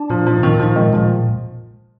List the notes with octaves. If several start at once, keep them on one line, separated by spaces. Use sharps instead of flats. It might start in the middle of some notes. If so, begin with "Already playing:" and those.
Already playing: D4
A#2 F3
F3 D#4
A#2 D#3
A#2 F3
D#3 G#3
A#2 F3